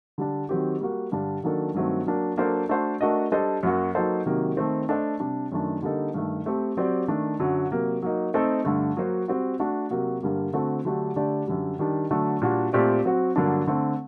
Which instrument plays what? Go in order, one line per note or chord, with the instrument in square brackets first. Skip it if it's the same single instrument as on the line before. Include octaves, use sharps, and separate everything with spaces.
[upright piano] D3 G3 D4
D#3 F#3 C4 G4
G3 A#3 F#4
G2 D3 G3 D4
D#3 F#3 A#3 D4 A4
G2 D#3 F#3 A3 C4
F#3 A#3 D4
F#3 A#3 D4 A4 C5
A3 D4 F#4 C5
A3 D4 F#4 A#4 D#5
G3 D4 A4 C5 D#5
F#2 F#3 A#3 F#4
F#3 A#3 D#4 A4 C5
C3 D#3 F#3 A#3
D#3 A3 C4
A3 D4 A4 C5 D#5
C3 G3 D4
F#2 D#3 A3 D4
D3 G3 A#3 D#4 A4
G2 D#3 A3
A3 C4 G4
F#3 C4 G4 D5
D#3 A3 D4
F#2 D3 F#3
C3 F#3 A#3
F#3 A#3 D#4
A3 C4 D#4 A4
G2 D3 A3
F#3 A#3 F#4 C5
G3 C4 F#4
A3 D4 F#4
C3 F#3 A#3 F#4
G2 D3 G3 A#3
D3 A3 C4 F#4 A4
D3 F#3 A3 D4 G4
D3 A3 D4 G4 D5
F#2 D3 G3
D#3 G3 D4
D3 F#3 A3 D4
A#2 G3 D4 F#4
A#2 A3 C4 G4 D5
F#3 C4 F#4
G2 D3 F#3 A#3 D4
D3 A3 C4